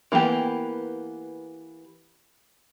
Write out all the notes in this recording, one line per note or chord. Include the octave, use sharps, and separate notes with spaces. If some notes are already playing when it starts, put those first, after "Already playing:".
E3 A#3 B3 G4